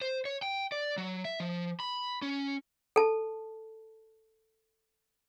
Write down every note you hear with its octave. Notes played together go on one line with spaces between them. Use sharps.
C5
C#5
G5
D5
F#3
E5
F3
B5
C#4
A4 A5